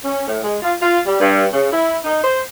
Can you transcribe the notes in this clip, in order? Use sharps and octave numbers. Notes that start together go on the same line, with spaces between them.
C#4
A2
G#3
F4
F4
G3
G2
C#3
E4
D#4
C5